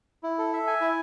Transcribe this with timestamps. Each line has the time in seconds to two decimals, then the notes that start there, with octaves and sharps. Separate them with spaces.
0.23 E4
0.38 A4
0.53 E5
0.67 G#5
0.81 E4